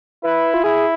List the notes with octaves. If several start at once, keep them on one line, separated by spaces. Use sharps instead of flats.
E4 B4
F4
E4 G#4